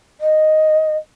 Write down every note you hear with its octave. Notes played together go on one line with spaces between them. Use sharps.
D#5